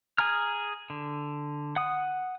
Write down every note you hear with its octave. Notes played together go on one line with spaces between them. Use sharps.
G#4 G#5 A#5 F6
D3
F#5 D#6